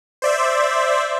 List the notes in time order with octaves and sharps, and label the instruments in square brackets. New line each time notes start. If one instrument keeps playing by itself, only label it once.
[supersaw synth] C5 D5 E5